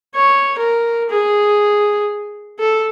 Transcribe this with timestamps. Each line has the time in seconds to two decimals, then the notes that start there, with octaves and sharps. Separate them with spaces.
0.15 C#5
0.58 A#4
1.10 G#4
2.59 A4